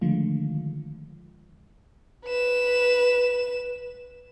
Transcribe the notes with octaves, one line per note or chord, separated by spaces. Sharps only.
D3 D#3 F3 G#3 A3 F4
B4 E7